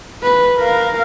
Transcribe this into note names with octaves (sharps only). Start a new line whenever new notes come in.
B4
A#4 F5